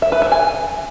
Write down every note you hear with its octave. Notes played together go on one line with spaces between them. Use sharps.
E5
B4
E5
G#5